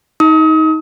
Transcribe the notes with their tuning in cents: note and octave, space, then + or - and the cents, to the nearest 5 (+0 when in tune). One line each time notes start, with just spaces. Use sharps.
D#4 +20 D#6 +35